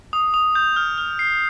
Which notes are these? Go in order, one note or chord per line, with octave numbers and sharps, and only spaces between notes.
D#6
D#6
G6
F6
F6
C7